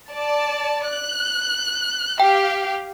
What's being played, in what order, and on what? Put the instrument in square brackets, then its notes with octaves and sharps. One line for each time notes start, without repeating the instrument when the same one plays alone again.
[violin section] D5 A5
F#6
[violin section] G4 F5 [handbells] G5